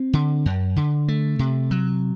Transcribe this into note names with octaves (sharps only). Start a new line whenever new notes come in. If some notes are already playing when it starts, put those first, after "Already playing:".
Already playing: C4
D3
F#2
D3
A3
C3
F#3